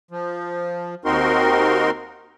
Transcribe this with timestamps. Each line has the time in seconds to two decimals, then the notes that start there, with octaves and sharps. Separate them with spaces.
0.11 F3
1.05 D#2 C4 D#4 F#4 A#4 C6